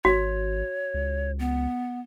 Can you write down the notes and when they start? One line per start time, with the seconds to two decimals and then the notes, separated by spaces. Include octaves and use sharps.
0.05 G#1 F#4 C#5
0.94 C#2
1.39 B3